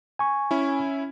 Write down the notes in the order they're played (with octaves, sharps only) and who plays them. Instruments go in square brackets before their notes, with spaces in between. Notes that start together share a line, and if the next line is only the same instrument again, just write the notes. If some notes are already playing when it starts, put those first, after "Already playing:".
[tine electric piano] G#5 C#6
[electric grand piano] C#4 E4